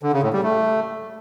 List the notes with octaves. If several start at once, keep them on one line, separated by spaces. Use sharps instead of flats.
D3
C#3
A2
G3
A3